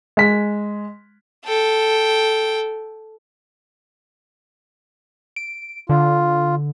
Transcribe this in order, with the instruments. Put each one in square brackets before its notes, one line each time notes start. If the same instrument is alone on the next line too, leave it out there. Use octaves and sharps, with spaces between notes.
[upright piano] G#3 B6
[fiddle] A4 G5
[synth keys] D7
[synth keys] D3 [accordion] F4